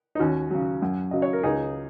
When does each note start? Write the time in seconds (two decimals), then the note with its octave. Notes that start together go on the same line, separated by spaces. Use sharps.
0.15 D#4
0.19 D#2 C#4 F#4
0.51 C#3 F#3
0.82 F#2
1.11 C#3 F#3 D#5
1.22 C#5
1.33 A#4
1.43 C#2 D#4 G#4